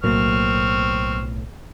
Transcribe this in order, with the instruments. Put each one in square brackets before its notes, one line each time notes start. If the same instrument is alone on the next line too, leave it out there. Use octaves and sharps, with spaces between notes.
[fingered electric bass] B1 A2 [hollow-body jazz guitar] F#3 A#3 [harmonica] C4 C#6 F6